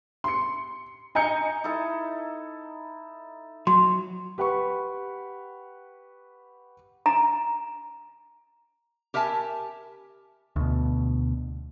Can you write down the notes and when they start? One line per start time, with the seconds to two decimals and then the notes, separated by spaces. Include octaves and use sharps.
0.24 C6 C#7
1.15 D#5 G#5 A#5 G6 C#7
1.64 D#4 E4 A4
3.67 F#3 C6
4.38 G4 B4 F#5 B5 C#6
7.06 A#5
9.14 G4 A#4 E5 G#5 A5
10.56 D2 B2